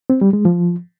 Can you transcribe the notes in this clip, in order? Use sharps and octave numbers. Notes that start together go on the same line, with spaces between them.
C4
G3
G#3
F3